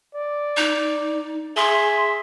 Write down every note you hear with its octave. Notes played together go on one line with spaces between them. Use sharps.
D5
D#4
G#4 E5 C6